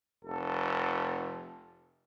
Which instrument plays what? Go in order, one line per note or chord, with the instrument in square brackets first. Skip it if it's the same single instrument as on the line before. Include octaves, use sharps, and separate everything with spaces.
[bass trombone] F1 [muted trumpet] A4